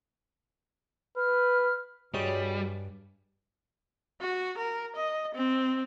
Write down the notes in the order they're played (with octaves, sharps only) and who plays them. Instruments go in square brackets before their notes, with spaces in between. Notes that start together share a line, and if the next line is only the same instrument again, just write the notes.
[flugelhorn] B4 [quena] F6
[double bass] G2 [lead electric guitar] G3 [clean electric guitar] F#4 G#4 D#5 [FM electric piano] C#5
[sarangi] F#4
A#4
D#5
C4